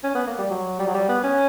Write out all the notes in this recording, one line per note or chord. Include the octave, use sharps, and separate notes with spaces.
C#4
B3
A#3
G3
F#3
G3
F#3
G3
B3
C#4